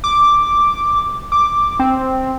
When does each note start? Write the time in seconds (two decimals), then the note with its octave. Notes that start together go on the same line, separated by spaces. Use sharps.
0.04 D6
1.32 D6
1.79 C4